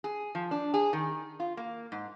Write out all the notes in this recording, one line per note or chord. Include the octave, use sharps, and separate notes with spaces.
G#4
F3
D4
G#4
D#3
F4
A#3
G#2